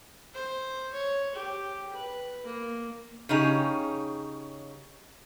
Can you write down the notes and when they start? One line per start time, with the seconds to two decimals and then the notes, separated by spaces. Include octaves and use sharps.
0.34 C5
0.93 C#5
1.35 G4
1.93 B4
2.46 A#3
3.29 C#3 C#4 D#4 G4 G#4